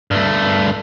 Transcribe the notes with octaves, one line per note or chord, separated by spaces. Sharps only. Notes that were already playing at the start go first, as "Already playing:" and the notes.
G2 A3